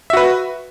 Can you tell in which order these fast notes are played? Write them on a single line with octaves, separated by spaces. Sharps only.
E5 F#4 B4